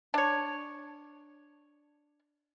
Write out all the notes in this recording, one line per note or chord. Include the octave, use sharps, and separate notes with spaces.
D4 C#5